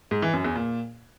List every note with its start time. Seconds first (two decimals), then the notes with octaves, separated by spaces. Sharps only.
0.11 G#2
0.22 E3
0.33 F#2
0.44 E2
0.56 A#2